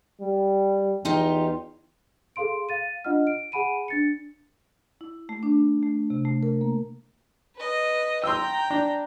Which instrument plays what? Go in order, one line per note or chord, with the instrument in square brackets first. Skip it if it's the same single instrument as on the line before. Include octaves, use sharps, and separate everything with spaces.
[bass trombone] G3
[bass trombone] E2 [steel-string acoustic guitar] D#4 F4 G4
[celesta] G#4 A4 F5 C6 D7
F5 A6 D#7
D4 F4 D#5 F#5 F6
D7
G#4 F#5 G#5 B5 D7 D#7
D4 A6 C#7
[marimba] E4
A3
D4
A3
C3
A3
A#4
A#3
[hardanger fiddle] B4 D#5
[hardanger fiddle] G5 A#5 [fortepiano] C6 E6
[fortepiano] D4